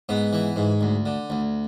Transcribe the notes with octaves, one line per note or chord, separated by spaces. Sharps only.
G#2 B3
E3
G#2
D2
D3
D2